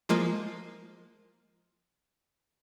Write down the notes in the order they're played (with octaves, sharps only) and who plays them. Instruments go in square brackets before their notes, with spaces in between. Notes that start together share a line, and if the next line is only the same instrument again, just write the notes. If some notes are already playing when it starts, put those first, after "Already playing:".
[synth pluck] F3 G#3 A#3 F4